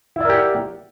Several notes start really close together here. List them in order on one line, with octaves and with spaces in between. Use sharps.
E4 D5 A#4 G4 F#5